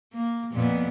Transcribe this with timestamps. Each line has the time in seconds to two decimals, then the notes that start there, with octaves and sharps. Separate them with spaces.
0.13 A#3
0.52 F2 A#2 B3